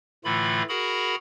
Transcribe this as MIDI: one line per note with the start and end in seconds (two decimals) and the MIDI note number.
0.25 0.63 45
0.25 0.63 50
0.25 0.63 52
0.25 0.63 57
0.25 0.63 65
0.25 0.63 83
0.69 1.15 66
0.69 1.15 68
0.69 1.15 70
0.69 1.15 78
0.69 1.15 82
0.69 1.15 83